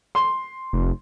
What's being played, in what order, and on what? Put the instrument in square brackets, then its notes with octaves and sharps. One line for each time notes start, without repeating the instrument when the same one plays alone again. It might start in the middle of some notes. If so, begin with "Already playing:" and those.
[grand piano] C6
[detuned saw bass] F1